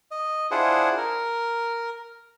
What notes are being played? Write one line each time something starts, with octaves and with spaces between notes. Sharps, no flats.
D#5
D4 E4 F4 G#4 C5 F#5
A#4